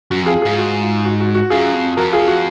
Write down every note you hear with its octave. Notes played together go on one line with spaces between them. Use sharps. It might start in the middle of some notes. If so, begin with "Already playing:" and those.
F#2 F#4
F2 F4 G#4
F4 G#4
G#2
F#4
F4
F#4
F#4
F#4
F#2 F4 G#4
F2
F2 F#4 A#4
F4 G#4
F#4